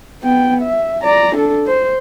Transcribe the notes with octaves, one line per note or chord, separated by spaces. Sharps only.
B3 G5
E5
D5 A#5
D4 A4
C5